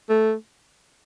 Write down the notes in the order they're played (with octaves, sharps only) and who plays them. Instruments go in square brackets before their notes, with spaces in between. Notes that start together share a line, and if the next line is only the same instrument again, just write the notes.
[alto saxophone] A3